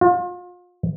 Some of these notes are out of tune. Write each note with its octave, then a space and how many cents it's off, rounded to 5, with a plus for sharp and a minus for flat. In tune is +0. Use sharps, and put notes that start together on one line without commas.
F4 +35